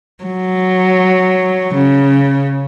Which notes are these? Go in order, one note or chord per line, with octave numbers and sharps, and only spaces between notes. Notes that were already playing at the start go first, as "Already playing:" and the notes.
F#3
C#3